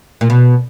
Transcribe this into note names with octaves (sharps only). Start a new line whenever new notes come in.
A#2
B2